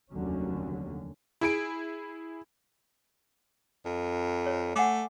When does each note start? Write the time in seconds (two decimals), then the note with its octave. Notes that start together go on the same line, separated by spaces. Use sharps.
0.10 F1 D#2 D3 F#3 C#4
1.41 E4 G#4 D7
3.86 F2
4.46 C#5
4.76 A3 F#5 G#5 D6